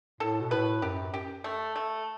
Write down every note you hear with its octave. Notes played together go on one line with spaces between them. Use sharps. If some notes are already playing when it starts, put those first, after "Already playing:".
A2 A4
B2
A2 B4
F#2 G4
G4
A3
A3